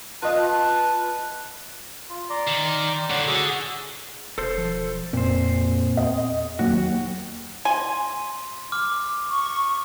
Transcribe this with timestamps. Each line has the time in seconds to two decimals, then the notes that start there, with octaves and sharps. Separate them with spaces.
0.22 F4 B4 D#5 A5 C6
2.09 F4
2.30 D5 A#5 C6
2.47 D#3
3.10 A2 D3 C#5 D5 F#5
3.27 D3 F#4 G#4 E6
4.38 E1 A4 C5
4.58 F3
5.13 F2 A#2 C4 C5
5.97 E2 D#5
6.59 D#2 F#3 F#4
7.65 G#5 C6
8.72 D6 F6
9.30 C#6